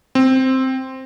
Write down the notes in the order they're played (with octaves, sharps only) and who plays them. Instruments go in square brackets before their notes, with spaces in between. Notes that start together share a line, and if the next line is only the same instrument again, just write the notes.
[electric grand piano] C4